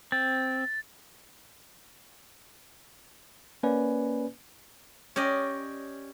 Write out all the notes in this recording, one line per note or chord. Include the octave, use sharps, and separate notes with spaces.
C4 A6
A#3 C#4 B4 D5 G#5
C#4 G4 D5 D#5